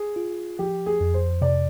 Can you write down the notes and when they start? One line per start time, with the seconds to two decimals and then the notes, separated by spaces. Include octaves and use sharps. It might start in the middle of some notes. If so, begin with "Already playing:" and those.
Already playing: G#4
0.16 F4
0.59 F3 G4
0.86 G#4
1.01 F2
1.14 C5
1.42 C3 D5